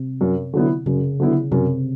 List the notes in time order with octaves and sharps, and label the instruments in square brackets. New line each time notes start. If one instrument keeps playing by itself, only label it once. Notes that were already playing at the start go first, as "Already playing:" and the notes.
Already playing: [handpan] C3
[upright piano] F#2
D3 F#3 B3 E4
[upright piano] F#2 [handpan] C#3
[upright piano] D3 F#3 B3 E4
[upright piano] F#2 [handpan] C3